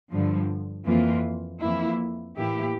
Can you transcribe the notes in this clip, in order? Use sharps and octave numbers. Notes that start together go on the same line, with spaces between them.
G2 D3 F3
F2 E3 A#3 F4
F2 E3 A#3 E4
A2 E3 A#3 E4 G4